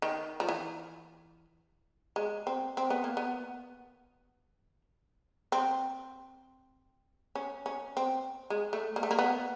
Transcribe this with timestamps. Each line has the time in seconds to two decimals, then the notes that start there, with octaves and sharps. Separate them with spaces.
0.02 D#3
0.40 F3
0.49 E3
2.16 G#3
2.47 C4
2.77 C4
2.90 B3
3.04 A#3
3.17 B3
5.52 C4
7.35 C#4
7.66 C#4
7.97 C4
8.50 G#3
8.73 A3
8.96 A#3
9.03 A3
9.11 A#3
9.19 B3